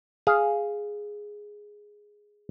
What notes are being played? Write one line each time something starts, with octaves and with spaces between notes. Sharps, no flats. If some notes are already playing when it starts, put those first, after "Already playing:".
G#4 F5